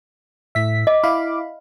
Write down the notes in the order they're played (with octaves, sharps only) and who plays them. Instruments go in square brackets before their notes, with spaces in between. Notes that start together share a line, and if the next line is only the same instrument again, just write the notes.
[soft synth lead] A2 [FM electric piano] E5 B6
[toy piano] D#5 [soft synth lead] D6
[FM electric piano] E4 F5 B5